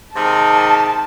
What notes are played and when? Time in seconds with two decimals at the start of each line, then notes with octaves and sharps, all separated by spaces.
0.14 G#2 C3 D#3 A5